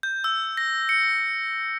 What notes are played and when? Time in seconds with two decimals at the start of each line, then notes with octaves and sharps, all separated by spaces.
0.03 G6
0.24 E6
0.57 A#6
0.89 C#7